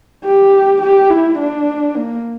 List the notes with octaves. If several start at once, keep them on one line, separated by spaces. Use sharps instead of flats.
G4
G4
E4
D4
A#3